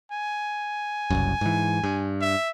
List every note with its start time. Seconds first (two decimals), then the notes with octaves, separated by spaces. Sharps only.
0.11 G#5
1.10 F#1 C2 F#2
1.41 G#2 E3
1.84 G2
2.21 E5